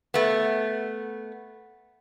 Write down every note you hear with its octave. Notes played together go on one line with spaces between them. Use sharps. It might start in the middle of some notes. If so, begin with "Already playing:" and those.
A3 B3